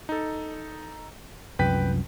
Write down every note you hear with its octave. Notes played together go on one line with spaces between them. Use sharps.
D#4 A4
C2 F#2 F3 B4 G5 B6